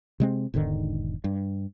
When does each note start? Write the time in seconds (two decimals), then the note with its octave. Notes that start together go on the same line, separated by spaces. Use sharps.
0.20 C3 G#3 C4
0.54 E1 G#2 D3 D#3
1.24 G2